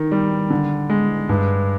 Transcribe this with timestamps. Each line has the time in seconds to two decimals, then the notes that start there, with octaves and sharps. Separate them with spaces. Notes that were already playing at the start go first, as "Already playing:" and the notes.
Already playing: D#3
0.12 G3
0.50 D3
0.90 G#3
1.29 G2